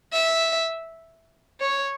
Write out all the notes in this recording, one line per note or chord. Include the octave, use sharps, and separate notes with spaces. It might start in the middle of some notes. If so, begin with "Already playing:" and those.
E5
C#5